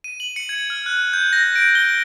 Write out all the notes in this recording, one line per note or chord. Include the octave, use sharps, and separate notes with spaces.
D#7
F#7
C#7
G#6
F6
F#6
G6
A#6
D7
G7